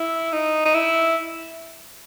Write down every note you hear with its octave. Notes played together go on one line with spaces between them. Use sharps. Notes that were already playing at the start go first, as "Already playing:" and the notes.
Already playing: E4
D#4
D#4
E4